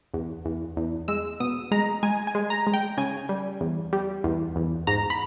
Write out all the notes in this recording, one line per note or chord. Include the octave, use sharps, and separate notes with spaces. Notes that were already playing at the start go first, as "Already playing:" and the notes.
E2
E2
E2
G#3 E6
B2 D#6
G#3 A#5
G#3 G#5
G#5
G#3
A#5
G#3
G5
C#3 G#5
G3
E2
G3
E2
E2
G#2 A#5
B5